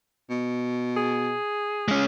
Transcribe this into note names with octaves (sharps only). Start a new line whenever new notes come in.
B2
G#4
G#3 C#4